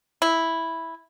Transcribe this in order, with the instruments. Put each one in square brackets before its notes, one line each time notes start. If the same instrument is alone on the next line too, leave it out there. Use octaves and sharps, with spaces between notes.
[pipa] E4